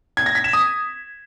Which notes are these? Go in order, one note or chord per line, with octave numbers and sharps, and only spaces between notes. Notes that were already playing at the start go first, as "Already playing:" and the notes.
G#6
A#6
B6
E7
D#6